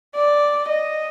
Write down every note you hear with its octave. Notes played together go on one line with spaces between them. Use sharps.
D5
D#5